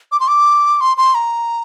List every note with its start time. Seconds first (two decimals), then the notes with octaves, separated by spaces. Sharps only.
0.12 D6
0.20 C6
0.28 D6
0.81 C6
0.97 C6
1.15 A#5